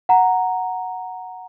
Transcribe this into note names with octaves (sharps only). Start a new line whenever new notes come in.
F#5 A#5